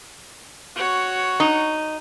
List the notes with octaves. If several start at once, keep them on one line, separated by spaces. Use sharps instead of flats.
F#4 C#5
D#4